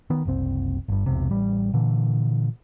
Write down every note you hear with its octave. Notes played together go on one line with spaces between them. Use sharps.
D#3 B3
F#1 C2 C4
G1 G2
E1 B1 C3
A1 G3
A#2 D3 E3